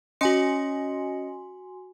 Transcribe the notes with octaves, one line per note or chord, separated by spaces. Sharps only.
C#4 F#4 D#5 G#5 C6 C#7